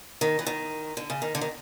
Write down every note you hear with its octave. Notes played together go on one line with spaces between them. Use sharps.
D#3
E3
D#3
D3
C#3
D#3
D3
D#3